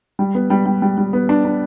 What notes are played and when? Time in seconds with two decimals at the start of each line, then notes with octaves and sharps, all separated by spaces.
0.19 G3
0.35 B3
0.50 G3
0.66 G3
0.82 G3
0.98 G3
1.13 B3
1.29 D4
1.45 D4